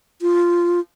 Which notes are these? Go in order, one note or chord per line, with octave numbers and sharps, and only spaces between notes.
F4